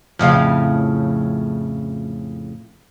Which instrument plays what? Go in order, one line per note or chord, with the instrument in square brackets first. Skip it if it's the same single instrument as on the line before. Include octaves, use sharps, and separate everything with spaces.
[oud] F2 A2 C#3 [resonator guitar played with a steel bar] F3 F5